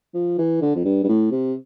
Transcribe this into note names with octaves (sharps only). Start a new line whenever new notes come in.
F3
E3
D3
F2
G2
G2
A2
C3